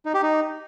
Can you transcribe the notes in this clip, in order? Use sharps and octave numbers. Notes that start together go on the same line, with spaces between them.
D#4
G4
D#4